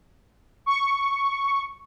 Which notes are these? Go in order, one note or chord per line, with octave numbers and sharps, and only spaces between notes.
C#6